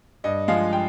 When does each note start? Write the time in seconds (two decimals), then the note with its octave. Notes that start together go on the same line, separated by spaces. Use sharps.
0.24 G2 D#5
0.48 F3 G#3 F5
0.73 G5